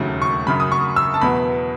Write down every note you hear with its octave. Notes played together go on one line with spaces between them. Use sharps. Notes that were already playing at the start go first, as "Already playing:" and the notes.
Already playing: E1 D#2 C#3 F#3 A3
C#6
F#2 C#3 F#3 B5
D#6
C#6
E6
A5
E2 B2 F#3 B3 B5